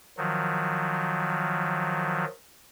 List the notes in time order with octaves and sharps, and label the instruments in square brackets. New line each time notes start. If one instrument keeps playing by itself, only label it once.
[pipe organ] D#3 F3 F#3